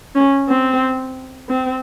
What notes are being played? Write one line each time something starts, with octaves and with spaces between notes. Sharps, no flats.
C#4
C4
C4